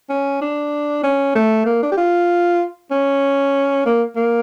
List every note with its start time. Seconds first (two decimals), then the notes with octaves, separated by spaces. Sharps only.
0.09 C#4
0.41 D4
1.03 C#4
1.35 A3
1.65 A#3
1.82 D4
1.91 G4
1.97 F4
2.91 C#4
3.86 A#3
4.16 A#3